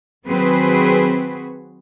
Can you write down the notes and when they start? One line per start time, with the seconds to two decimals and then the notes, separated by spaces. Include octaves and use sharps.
0.25 D#3 F#3 C4 F#4 G#4 B4